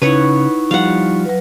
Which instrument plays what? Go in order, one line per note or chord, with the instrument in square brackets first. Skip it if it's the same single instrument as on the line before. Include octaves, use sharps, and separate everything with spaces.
[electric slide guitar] C#3 [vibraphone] D#4 E4 C#6 [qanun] B4 C#5 F#5
[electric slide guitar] F3 G3 [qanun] F5 F#5
[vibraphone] F#3 B4